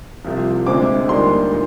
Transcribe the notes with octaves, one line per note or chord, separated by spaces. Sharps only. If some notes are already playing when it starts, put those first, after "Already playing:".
C2 C3 F3
D2 D3 G#3 C4 D6
D#2 D#3 G3 D4 C6
A#2